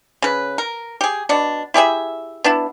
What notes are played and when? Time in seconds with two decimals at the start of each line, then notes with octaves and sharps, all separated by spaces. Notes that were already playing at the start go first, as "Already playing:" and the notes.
0.22 C#3 B4
0.58 A#4
1.01 G4 G#4
1.29 B2 D4
1.74 E4 G4 G#4 E5
2.44 B3 D4 E4